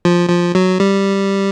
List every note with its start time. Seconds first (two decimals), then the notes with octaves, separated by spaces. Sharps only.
0.05 F3
0.30 F3
0.55 F#3
0.80 G3